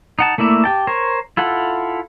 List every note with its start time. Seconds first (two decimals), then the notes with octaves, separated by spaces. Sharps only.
0.19 D#4 F#5 A5
0.38 A3 A#3 E4 D5 E5
0.64 G4 G5 A5
0.87 A#4 C5 C#5
1.37 E4 F4 A4 F#5